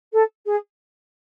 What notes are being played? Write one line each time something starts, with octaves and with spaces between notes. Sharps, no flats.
A4
G#4